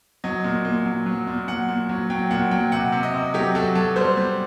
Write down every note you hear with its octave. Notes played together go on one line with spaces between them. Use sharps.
F#3 D#5
A#2
A#2
F#3
F#3
A#2
F#3 F#5
A#2
F#3
F#3 G5
A#2 F#5
F#3 G5
C3 F#5
C3
D#5
C3
F#3 G4
F#3 A4
F#3 A4
G3 C5
G3